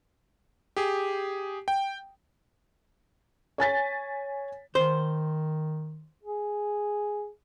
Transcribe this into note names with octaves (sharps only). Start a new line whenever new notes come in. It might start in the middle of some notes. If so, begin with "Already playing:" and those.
G4 G#4
G5
C#5 G#5 A6 B6
D#3 C5
G#4